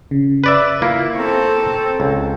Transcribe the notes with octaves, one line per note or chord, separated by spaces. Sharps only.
C#3
B4 D5 E5
A#3 E4 F4
C4 A4 A#5 C#6
C#2